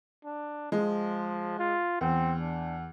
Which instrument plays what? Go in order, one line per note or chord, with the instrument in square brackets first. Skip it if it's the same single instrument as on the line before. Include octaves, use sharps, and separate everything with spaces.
[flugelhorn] D4
[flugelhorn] F3 [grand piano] G#3
[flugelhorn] F4
[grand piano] E2 [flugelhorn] C4
[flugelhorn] D4